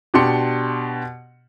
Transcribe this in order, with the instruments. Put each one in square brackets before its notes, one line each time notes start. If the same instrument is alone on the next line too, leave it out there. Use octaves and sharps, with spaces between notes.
[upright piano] B2 D4 G4 C6 C#7